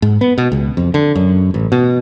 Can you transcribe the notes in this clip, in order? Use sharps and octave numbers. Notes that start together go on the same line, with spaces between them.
G#2
B3
B2
C#2
F2
D3
F#2
A1
B2